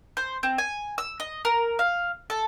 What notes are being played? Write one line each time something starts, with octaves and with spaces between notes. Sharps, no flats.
C5
C4
G#5
E6
D#5
A#4
F5
A4